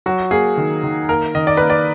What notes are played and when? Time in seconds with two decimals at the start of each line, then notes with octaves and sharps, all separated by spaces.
0.06 F#3 F#4
0.31 A#3 G#4
0.57 D#3
0.84 D#3
1.09 A#3 A#4
1.35 D#3 D#5
1.47 D5
1.57 A#3 B4
1.70 D5